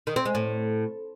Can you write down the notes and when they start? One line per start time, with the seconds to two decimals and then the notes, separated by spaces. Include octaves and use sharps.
0.07 D#3
0.16 C4
0.25 G#3
0.35 A2